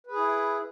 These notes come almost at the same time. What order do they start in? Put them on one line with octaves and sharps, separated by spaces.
B4 G#4 E4